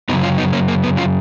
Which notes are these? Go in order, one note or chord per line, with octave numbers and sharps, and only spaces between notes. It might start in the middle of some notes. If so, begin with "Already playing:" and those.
F#2 C#3 F#3 B3 D#4
C#4 F4
B3 D#4
A#3 C#4
A#3
B3
C#4 F4